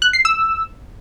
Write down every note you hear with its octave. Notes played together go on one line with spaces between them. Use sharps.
F#6
C7
E6